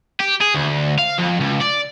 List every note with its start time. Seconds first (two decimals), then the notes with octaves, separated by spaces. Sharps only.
0.20 G4
0.41 G#4
0.55 D2
0.99 F5
1.19 F2
1.41 C#2
1.61 D5